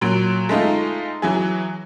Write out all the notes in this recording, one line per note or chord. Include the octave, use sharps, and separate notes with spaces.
A#2 F#3 D7
G#3 A3 D#4 F4
E3 F#3 G#4